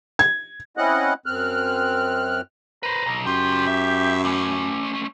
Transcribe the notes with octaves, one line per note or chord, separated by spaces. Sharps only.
G#6
C4 C#4 E4 D#5 F#5 F#6
F#2 C4 F6 F#6
B4 C5 A#5
B1
F#2 C#3 F4 G4
E5
A3 C#4 D6